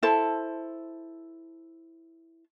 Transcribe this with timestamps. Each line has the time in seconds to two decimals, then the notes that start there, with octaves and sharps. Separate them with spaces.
0.03 E4 A4 C5 A5